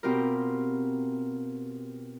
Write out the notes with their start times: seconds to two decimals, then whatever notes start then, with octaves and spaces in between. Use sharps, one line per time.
0.03 B2 C4 F4 G4 A#4